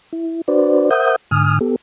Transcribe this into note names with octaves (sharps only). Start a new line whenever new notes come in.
E4
D4 F#4 B4 C5 D5
A#4 C5 E5 F#5 D#6 G6
G#2 D3 G#5 D#6 F6
B3 G4 A4